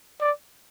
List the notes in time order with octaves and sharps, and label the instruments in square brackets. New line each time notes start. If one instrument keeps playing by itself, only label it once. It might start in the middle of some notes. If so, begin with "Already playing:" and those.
[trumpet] D5